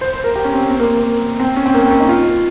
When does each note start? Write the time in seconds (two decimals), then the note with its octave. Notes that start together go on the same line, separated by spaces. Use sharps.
0.01 C5
0.13 C5
0.24 A#4
0.35 G4
0.45 C#4
0.53 C4
0.70 C4
0.80 A#3
0.98 A#3
1.40 C4
1.56 C#4
1.66 C4
1.74 A#3
1.83 C4
1.91 C#4
2.00 D#4
2.08 F4